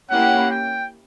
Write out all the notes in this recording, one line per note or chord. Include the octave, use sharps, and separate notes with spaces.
A#3 C#4 E4 G4 F#5
G5